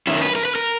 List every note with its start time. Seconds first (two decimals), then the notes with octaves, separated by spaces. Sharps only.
0.07 F#2 D#3 E4
0.17 A#4
0.22 B4
0.35 A#4
0.45 B4
0.55 A#4